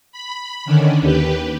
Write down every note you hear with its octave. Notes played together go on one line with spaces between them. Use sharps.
B5
D3 D#3 C#4 D4
D#2 G4 B4